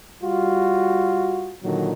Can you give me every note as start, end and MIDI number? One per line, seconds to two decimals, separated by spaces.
0.22 1.55 55
0.22 1.55 65
0.22 1.55 66
1.62 1.92 46
1.62 1.92 50
1.62 1.92 51
1.62 1.92 54